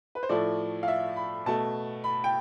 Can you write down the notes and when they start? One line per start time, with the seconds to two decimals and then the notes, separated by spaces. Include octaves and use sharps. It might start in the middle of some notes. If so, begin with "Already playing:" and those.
0.15 B4
0.23 C5
0.29 A2 F3 A3 D5
0.83 F5
0.88 E5
1.16 B5
1.46 B2 A3 A5
2.04 B5
2.24 G5